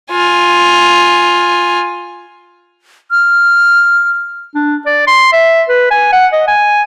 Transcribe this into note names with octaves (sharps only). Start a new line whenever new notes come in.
F4 G#5
F6
D4
D5
C6
E5
B4
G#5
F#5
D#5
G#5